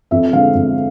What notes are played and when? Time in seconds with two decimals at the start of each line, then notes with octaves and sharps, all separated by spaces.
0.11 F2 E5
0.32 D3 G#3 F5
0.55 F2